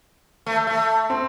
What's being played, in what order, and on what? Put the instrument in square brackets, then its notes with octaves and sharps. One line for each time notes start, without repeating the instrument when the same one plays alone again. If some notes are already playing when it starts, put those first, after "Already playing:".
[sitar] A3
A3
[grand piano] C4